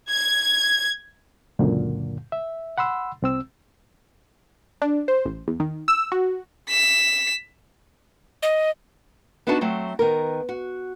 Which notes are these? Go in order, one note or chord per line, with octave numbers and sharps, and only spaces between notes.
G#6
C#2 F#2 A#2 D3
E5
F#5 B5 C6 E6
C2 C4 E6
D4
C5
A1
E2
D#3
E6
F#4
B6 E7
D#5
B3 D4 D#4 F#4 G#5 A5
F#3 A3 C4
D#3 B3 A#4
F#4